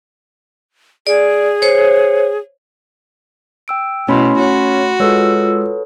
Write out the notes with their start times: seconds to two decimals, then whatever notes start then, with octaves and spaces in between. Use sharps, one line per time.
1.07 G#4 D5
1.62 C5 C#5
3.68 G5 E6 D7
4.09 B2 A3 C#4 E4 B5 C6
4.39 F#4 C#5
5.00 G#3 F4 A4 B4 C#5 E6